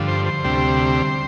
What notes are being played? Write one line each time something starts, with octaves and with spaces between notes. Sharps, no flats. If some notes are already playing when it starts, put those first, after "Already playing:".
Already playing: G2 D3 F3
C5
C5
D2 C3 G3